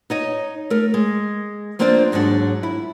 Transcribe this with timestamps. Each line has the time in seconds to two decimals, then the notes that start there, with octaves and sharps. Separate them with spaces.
0.10 D#4 C#5 D#5
0.70 A3 A#4
0.94 G#3
1.79 F3 A#3 C4 D4 C5 D5
2.12 D#2 G#2 F#3 D4
2.63 E4